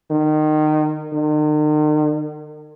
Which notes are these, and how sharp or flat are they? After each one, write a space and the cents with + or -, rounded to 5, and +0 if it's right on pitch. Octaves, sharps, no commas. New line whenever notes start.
D#3 -25
D#3 -45